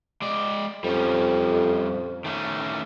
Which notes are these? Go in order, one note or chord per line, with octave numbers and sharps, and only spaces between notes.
G#3 D5
F2 G3 C#4
D#3 A3 C#4